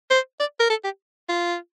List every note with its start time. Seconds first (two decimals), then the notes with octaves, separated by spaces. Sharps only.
0.10 C5
0.40 D5
0.60 A#4
0.70 A4
0.84 G4
1.29 F4